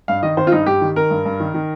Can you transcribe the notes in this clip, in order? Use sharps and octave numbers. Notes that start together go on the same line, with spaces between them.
G2 F5
D#3 D#5
D#3 C5
F4
G2 D#4
G2 G4
D#3
D#3 A#4
G2
G2
D#3
D#3